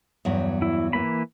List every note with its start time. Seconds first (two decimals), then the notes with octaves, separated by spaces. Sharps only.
0.25 E2 G2 F#3
0.62 E4
0.93 E3 A#3 B5